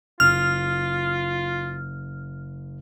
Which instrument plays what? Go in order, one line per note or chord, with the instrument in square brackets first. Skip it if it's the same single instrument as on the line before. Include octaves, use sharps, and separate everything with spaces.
[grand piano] F#1 [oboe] F4 [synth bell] F6